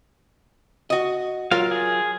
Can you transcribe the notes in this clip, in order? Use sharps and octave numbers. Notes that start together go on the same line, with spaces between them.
F#4 D#5
F#3 F4 A#4 F5
G#4